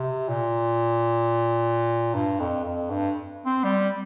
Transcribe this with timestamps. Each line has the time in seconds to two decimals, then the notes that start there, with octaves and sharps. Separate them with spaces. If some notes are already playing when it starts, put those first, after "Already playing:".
Already playing: C3
0.29 A#2
2.15 G2
2.40 F2
2.65 F2
2.90 G2
3.46 C4
3.64 G3